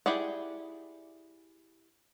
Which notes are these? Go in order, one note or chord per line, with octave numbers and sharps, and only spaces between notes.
E4 G4 G#4 D5 F#5